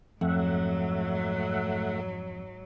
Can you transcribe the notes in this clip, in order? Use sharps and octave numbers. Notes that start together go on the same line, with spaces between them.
F2 G#2 F#3 A3 E5 F#5